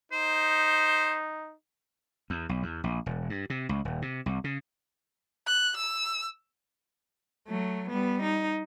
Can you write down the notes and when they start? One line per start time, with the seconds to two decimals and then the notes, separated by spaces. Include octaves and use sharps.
0.12 D#4 C5
2.30 E2
2.49 B1
2.63 E2
2.84 A#1
3.06 E1
3.30 G2
3.50 C3
3.69 C#2
3.85 D#1
4.02 C3
4.26 C2
4.44 C#3
5.47 F#6
5.77 E6
7.47 F#3 A3
7.89 G3 B3
8.22 D#4